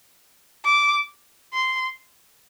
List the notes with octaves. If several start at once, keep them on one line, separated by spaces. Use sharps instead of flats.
D6
C6